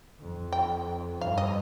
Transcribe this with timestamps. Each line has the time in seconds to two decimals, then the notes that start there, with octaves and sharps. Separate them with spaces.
0.20 F2
0.52 G5
1.21 G2 F5
1.38 D#5